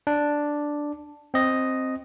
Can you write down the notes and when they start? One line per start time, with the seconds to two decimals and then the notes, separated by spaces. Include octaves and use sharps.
0.07 D4
1.34 C4 D#5